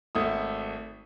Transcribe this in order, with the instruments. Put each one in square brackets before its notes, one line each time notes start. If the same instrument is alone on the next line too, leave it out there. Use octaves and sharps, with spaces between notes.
[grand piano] G#1 A3 E5 D#6